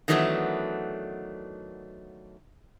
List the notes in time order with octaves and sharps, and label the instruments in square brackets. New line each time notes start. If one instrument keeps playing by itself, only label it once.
[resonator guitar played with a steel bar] D#3 E3 F#3 A3 B3 D4